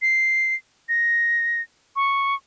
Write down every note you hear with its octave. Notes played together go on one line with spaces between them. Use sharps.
C7
A#6
C#6